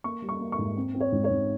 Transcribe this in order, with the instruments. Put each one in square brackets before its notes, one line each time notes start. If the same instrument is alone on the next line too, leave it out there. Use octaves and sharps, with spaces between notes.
[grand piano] A#3 C#6
G3
C#6
A#3
C#6
G#2
C4
C4
C#5
G#2
C#5
G#2